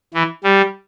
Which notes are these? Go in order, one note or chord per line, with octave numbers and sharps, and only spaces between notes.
E3
G3